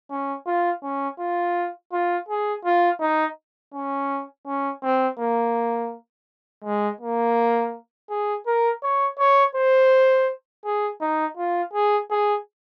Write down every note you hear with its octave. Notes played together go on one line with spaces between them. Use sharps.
C#4
F4
C#4
F4
F4
G#4
F4
D#4
C#4
C#4
C4
A#3
G#3
A#3
G#4
A#4
C#5
C#5
C5
G#4
D#4
F4
G#4
G#4